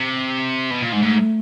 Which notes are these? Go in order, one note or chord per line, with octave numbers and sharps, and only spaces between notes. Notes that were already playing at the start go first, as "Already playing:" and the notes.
Already playing: C3
B2
A#2
G#2
G#3
G#2 A3